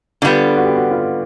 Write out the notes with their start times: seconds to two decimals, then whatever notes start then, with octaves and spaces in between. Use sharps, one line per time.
0.22 D3 G3 B3 F4
0.57 F#4
0.66 G4
0.75 F#4
0.91 F4